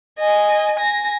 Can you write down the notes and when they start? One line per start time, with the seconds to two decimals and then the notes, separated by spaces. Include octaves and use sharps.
0.19 D#5 G#5
0.75 G#5 A#6